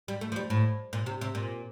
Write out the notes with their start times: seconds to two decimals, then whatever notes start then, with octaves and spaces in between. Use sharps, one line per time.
0.08 G3
0.21 A3
0.32 F3
0.36 G3
0.50 A2
0.93 A#2
1.06 C3
1.21 C3
1.35 A#2